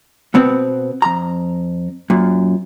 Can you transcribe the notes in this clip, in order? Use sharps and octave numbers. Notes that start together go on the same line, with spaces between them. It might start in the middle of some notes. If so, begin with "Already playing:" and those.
B2 B3 C4
F2 A#5
F#2 A#2